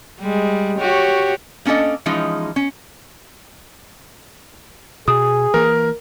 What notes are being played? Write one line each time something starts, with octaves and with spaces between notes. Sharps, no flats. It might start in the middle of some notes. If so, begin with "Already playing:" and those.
G3 G#3
F#4 G4 C#5
A#3 C#4 D4 A4 D#5
E3 F3 G#3 C#4 D#4
C#4
B2 G#4 D#6
E3 A#3 A#4